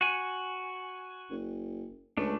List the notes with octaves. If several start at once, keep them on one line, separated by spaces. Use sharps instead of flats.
F#4 G#5
F#1
C#2 A3 D4